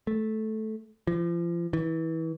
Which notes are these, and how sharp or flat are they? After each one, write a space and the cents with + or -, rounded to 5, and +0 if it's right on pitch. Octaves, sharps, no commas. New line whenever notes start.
A3 -10
F3 -35
E3 -25